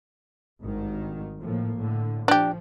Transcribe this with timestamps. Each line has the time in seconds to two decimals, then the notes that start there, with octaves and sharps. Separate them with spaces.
0.63 G#1 G2 D#3
1.40 A2 F3 A#3
1.76 A2 D3
2.28 F3 D4 G4